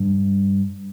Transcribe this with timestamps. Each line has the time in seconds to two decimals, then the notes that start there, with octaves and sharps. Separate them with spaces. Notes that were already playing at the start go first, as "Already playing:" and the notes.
Already playing: G2